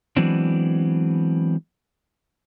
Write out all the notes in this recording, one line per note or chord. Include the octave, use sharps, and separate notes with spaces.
E3 F#3 G#3 B3 C4 D4